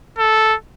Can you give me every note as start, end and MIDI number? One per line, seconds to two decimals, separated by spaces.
0.18 0.55 69